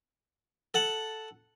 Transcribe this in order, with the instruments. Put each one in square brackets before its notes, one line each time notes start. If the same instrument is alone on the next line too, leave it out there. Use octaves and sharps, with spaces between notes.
[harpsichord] A4 F#5 A5